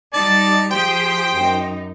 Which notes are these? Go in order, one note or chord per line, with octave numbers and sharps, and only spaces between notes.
G3 D#4 D5 A5
F3 G4 G#4 C5 G5
F#2 D#4